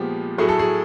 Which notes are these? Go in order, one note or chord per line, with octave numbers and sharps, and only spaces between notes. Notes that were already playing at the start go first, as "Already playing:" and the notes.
Already playing: A#2 F3 G#3 B3 G4
A2 F#3 A3 G#4
A4
G#4